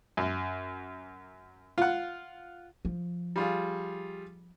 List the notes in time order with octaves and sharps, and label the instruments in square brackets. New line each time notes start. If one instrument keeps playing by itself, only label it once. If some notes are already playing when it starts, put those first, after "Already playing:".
[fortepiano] F#2
F4 F#5
[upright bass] F3
[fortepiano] G3 F4 G#4